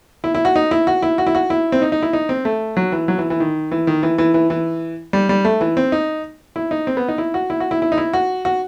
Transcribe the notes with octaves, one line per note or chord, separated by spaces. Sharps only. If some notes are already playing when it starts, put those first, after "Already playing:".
E4
E4
F#4
D#4
E4
F#4
E4
F#4
E4
F#4
E4
C4
D#4
D#4
E4
D#4
C4
A3
F#3
E3
F#3
E3
E3
D#3
E3
D#3
E3
E3
E3
E3
G3
G3
A3
E3
C4
D#4
E4
D#4
C4
B3
D#4
E4
F#4
E4
F#4
E4
E4
D#4
E4
F#4
F#4